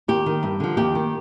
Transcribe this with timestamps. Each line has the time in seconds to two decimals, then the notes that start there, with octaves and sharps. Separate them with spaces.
0.08 D#2 G4
0.26 D#3
0.43 G2
0.60 D3 F3
0.77 D#2 G4
0.95 D#3